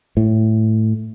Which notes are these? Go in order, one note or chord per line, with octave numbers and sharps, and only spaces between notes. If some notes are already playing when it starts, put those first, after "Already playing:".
A2